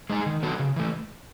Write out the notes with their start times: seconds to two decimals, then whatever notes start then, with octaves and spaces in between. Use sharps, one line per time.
0.10 G#3 D#4 G#4
0.26 D#3
0.43 F#3 B3 F#4 A4
0.59 C#3
0.76 E3 A3